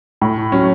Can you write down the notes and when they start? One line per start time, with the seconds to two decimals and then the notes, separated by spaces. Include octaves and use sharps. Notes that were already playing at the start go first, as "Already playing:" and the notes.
0.21 A2
0.52 F#3 C#4